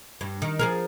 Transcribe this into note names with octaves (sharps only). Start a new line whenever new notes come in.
G2
D#3
F3 G#4 A#4